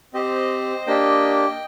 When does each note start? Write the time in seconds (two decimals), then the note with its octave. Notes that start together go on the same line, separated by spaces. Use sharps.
0.14 C4 G4 C5 D#5
0.86 A#3 D4 G4 D#5 G5